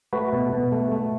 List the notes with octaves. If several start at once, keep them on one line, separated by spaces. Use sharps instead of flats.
A3 F#4 B4
B2
B2
A3
A3